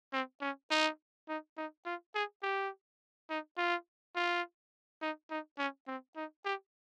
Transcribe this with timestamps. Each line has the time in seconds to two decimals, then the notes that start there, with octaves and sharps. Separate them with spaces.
0.13 C4
0.41 C#4
0.71 D#4
1.28 D#4
1.57 D#4
1.86 F4
2.15 G#4
2.43 G4
3.30 D#4
3.58 F4
4.15 F4
5.02 D#4
5.31 D#4
5.58 C#4
5.87 C4
6.16 D#4
6.45 G4